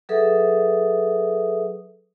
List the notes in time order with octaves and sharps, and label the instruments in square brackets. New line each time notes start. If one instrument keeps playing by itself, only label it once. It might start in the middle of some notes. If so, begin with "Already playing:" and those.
[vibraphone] F#3 G#4 A4 B4 E5 D#6